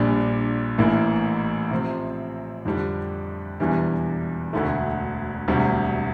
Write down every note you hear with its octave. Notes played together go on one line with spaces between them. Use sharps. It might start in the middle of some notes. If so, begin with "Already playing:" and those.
Already playing: A#1 A#2 G3 D4
A1 A2 E3 A#3
C3 F3 C4
F2 D3 G3 D4
E1 E2 E3 G3 D4
E1 D2 D3 A3
E1 D2 C3 G3